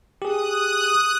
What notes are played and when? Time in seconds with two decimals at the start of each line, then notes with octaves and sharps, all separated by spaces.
0.22 G4 G#4 D#6 F#6